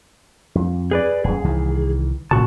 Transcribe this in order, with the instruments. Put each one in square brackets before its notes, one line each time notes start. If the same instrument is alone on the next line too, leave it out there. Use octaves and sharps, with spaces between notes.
[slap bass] F2
[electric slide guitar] G#4 B4 D5
[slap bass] D#1 F#2 [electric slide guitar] G#4
[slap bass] C2 D#3 E3
[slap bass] A#1 C#3 [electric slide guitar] A#2 F#4 A5